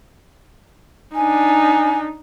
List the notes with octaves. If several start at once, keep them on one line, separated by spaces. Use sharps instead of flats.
D4 D#4 G#5